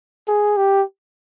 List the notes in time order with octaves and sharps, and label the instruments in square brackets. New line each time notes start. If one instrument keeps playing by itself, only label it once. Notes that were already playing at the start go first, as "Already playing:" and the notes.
[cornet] G#4
G4